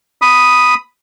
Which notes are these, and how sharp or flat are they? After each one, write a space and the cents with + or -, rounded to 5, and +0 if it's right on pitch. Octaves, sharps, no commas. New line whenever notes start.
B5 +0 D#6 +0